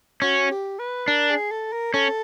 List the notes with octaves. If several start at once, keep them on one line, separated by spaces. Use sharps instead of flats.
C#4 F#4
G4
B4
D4 A#4
G#4
A4
A#4
C#4 A4